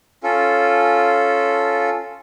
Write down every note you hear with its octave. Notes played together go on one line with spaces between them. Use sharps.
C#4 F4 A4